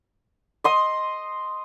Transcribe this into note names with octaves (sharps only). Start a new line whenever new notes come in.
D#5 C6 D#6